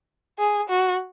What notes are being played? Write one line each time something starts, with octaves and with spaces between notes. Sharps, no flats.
G#4
F#4